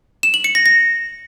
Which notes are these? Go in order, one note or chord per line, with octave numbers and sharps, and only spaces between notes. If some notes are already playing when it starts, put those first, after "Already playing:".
E7
F#7
C#7
A#6
A#6